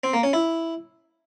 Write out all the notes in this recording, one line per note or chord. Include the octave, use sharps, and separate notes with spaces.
C4
A#3
C#4
E4